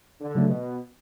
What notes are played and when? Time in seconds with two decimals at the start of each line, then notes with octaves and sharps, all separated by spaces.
0.20 D3
0.35 C#3 F#3 A3
0.49 B2